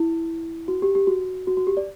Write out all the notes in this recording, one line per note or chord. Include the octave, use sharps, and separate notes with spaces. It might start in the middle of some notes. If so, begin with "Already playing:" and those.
Already playing: E4
F#4
G4
G4
F#4
F#4
F#4
G4
D5